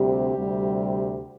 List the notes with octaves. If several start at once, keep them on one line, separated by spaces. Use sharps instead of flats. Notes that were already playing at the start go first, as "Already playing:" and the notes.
Already playing: D2 C3 G3 C4 G4
D2 C3 G3